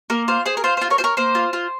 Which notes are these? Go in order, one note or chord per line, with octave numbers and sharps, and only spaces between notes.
A#3 A#4
F4 C5
G#4 C5
A#4
F4 C5
F4 C5
A#4 C#5
F4 C5
A#4 C#5
A#3 C5
F4
F4